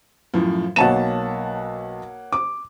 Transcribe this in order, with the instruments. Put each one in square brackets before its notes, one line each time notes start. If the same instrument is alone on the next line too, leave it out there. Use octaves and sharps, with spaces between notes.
[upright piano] F#2 A2 F3
[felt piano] B1 A5 E7 [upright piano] A#3 C#5 F#5
[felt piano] D6